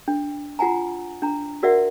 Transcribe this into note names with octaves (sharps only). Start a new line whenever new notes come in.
D4
F4 F#5 G#5 A#5
D4 A#5
F#4 A#4 D5 E5 F#5